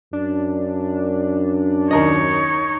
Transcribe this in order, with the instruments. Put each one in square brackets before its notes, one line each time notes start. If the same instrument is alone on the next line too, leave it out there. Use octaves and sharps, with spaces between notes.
[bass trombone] F#2 [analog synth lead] D4
[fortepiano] D#2 A#4 D#5 [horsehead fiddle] D#4 C#5